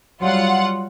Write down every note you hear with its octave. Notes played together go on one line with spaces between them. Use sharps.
F#3 G3 F4 F#5